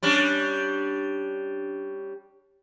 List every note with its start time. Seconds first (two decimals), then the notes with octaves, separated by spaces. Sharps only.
0.03 G3 C#4 D4